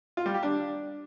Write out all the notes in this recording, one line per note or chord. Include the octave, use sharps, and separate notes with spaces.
F4
G3
G4
D4